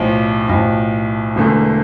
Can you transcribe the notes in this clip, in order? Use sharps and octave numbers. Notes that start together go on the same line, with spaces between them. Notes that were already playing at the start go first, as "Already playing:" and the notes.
Already playing: B1 A2 F3
B1 A2 F3
E1 E2 D3 A3